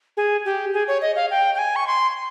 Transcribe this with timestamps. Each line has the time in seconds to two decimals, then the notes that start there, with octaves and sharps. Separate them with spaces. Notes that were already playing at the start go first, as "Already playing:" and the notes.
0.17 G#4
0.45 G4
0.74 G#4
0.88 C#5
1.02 D#5
1.16 F5
1.31 G5
1.55 G5
1.58 G#5
1.76 C#6
1.87 C6